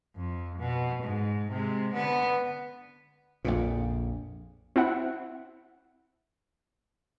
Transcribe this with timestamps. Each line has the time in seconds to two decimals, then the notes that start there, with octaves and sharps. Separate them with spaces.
0.16 F2
0.59 B2
1.03 G#2
1.51 C3 G#3
1.94 D3 B3
3.45 A#1 F2 A#2
4.76 C4 E4 E5 F#5